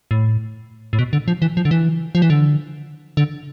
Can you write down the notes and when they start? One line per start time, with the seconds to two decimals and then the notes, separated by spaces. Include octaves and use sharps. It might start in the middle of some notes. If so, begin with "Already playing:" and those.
0.11 A2
0.93 A2
0.99 B2
1.13 D3
1.28 F3
1.42 E3
1.57 F3
1.65 D3
1.71 E3
2.15 F3
2.22 E3
2.30 D3
3.17 D3